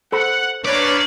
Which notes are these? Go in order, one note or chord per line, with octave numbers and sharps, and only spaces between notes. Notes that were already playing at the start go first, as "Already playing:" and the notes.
A4 C5 F#5 B5
A3 A#3 C#4 D4 B4 C#5 D5